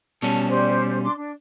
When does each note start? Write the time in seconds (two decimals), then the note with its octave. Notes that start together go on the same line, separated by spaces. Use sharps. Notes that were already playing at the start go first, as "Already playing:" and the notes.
0.23 B2 G3 C#4 A5
0.48 G4 C5 D5
1.02 D4 C6 D6
1.15 D4